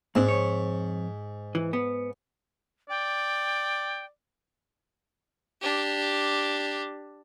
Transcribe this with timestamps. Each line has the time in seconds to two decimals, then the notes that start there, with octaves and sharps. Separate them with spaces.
0.15 G#2 A#3 C4 D4
0.28 F2 C#5
1.55 E3
1.73 B3
2.90 D5 G5
5.62 D4 G4